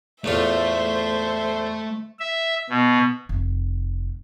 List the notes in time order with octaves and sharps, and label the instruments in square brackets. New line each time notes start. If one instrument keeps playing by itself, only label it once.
[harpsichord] E2 A2 F4 [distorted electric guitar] A3 [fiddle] C5 E5
[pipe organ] E5
B2
[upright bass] F1